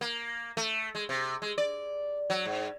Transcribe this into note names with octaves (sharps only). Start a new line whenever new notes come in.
A#3
A3
G#3
C3
G#3
D5
F#3
G#2